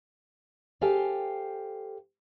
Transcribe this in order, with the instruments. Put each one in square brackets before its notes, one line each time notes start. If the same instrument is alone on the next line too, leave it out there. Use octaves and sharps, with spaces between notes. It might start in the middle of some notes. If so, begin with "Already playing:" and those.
[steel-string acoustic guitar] G4 A4 C5 F5 G5 G#5